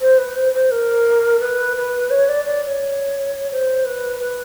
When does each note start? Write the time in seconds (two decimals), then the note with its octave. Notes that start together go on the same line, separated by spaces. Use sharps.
0.01 C5
0.18 B4
0.36 C5
0.54 C5
0.71 A#4
1.40 B4
1.76 B4
2.10 C#5
2.29 D5
2.45 D5
2.64 D5
2.67 C#5
3.51 C5
3.85 B4
4.20 B4